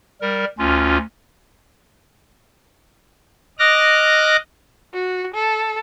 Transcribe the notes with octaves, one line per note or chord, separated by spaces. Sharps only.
G3 A#4
D2 C#4 F4
D#5 D6 F6 F#6 A#6
F#4
A4